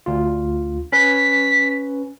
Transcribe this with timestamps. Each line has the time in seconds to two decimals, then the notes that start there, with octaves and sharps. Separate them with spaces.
0.06 D2 F4
0.92 C#4 B4 B6